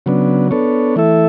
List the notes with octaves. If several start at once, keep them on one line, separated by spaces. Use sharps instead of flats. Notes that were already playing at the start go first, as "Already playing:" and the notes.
C#3 F#3 B3 D4
B3 D4 A4 C#5
E3 A3 E4 A4 E5